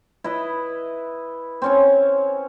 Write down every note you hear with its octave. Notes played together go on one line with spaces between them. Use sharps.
E4 B4 D#5
C4 C#4 C#5